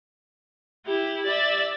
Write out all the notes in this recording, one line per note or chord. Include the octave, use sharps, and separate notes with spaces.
E4 G4
D5 E5